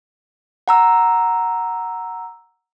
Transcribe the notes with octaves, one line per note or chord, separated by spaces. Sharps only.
F#5 A#5 E6